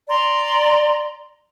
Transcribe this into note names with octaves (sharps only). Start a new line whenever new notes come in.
D5 A#5 C6